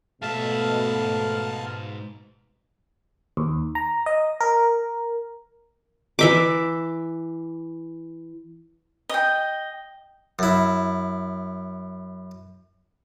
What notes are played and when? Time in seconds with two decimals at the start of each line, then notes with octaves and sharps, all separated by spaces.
0.22 G#2 B2 A3 E5 F5 A5
3.37 D#2
3.75 A#5
4.06 D#5
4.41 A#4
6.19 E3 E5 D6
9.09 D#5 G5
10.39 F#2 E4